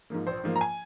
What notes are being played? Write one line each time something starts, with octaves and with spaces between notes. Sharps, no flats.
G#2 F3 A#3
A#1 C5
G#2 F3 A#3
A#5
G#5